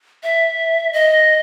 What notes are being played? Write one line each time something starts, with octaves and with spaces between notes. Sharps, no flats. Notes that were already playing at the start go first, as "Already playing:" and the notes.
E5
D#5